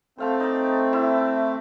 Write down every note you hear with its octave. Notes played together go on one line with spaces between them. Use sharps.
A3 C4 C5 F5 A5
D#4 D5
E4 E5